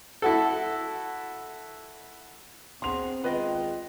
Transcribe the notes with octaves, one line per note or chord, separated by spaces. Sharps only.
E4 F#4 A4
B3 C4 F#4 G#4 C6 F7
D#3 G#3 F4 B4 D5 D#5